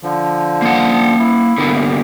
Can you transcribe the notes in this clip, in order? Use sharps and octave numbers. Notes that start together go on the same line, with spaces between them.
D3 F3
A#3 F#5
E4
D3 A#3 B3